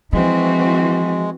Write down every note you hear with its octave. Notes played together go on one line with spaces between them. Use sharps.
E3 F3 G#3 C4 F#4